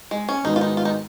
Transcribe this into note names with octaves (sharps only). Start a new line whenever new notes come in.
G#3
C#4
G#2 D#3 G#3 B3 D#4 F#4
F4
D#4
F4
D#4